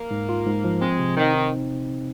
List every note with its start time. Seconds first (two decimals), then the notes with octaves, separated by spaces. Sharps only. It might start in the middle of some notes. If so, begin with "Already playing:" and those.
Already playing: A#3
0.11 G#2
0.29 F4
0.46 G#2
0.64 F3
0.81 G#3 C4
0.99 C3
1.17 D#3 C4
1.34 D#4